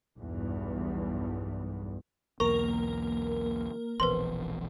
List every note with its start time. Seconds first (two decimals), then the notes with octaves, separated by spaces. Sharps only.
0.17 B1 E2 G2
2.40 B1 E2 A#3 A#4 C#6
4.00 E1 A#1 E2 B4 C5 C6